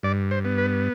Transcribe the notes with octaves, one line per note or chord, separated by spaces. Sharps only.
G2 D5
C5
B3
B4